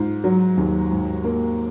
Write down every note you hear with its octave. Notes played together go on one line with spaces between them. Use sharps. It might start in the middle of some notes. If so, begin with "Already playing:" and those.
Already playing: G#2 F4
F#3
D#2
G#2
A#3